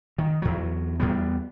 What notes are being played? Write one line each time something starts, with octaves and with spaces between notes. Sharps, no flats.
D#3
E2 F#3
E2 G3 B3